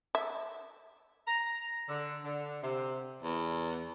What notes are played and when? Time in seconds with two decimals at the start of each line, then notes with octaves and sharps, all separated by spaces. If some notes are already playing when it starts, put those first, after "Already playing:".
0.15 E5
1.26 A#5
1.88 D3
2.24 D3
2.62 C3
3.22 E2